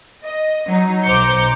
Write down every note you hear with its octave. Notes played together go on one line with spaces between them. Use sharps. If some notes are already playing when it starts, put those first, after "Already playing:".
D#5
F#3 D#4
B1 C5 A#5 D6 G6 C#7